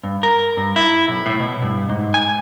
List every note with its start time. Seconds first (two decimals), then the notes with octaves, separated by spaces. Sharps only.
0.03 G2
0.23 A#4
0.57 G2
0.76 E4
1.08 B1
1.26 A2
1.40 B2
1.62 G2
1.89 G#2
2.14 G#5